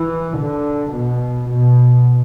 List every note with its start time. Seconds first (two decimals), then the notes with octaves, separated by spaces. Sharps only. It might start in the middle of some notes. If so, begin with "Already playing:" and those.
Already playing: E3
0.37 D3
0.92 B2
1.49 B2